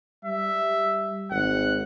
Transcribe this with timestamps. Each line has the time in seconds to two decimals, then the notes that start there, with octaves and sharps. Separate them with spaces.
0.25 G3 E5
1.31 G#1 F#5